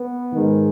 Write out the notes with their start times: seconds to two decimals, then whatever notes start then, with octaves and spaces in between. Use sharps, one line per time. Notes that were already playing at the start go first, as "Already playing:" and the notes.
Already playing: B3
0.32 G#2 D#3 G#3